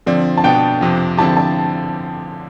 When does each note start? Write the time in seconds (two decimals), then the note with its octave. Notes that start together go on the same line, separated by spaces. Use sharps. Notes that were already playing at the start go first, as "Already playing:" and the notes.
0.06 D3 F3 C4 D5
0.37 A5
0.44 B2 B3 D4 G5
0.81 F2 C3 F3
1.17 D3 F3 C4 E4 G4 A5
1.37 A5